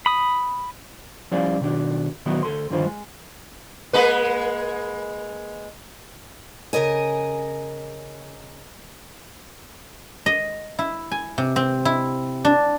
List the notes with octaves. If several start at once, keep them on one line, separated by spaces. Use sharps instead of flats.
B5 D#6
F3 G3 C#4 E4 D5 F5
B2 D#3 D4 F#4
A#2 D#3 F#3 B3 E4 F#4
D2 A4 C6
G2 D3 D#3 F3 F4 C5
G#3
G#3 A#3 B4
C#3 A#4 D#5 G#5
D#5
E4
G#5
C3
C4
E4
D4